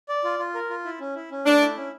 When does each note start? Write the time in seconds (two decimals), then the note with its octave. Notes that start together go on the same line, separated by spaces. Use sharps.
0.09 D5
0.24 F4
0.39 F4
0.55 A#4
0.70 F4
0.85 E4
1.00 C#4
1.15 E4
1.31 C#4
1.46 A3 D4
1.61 E4
1.77 C#4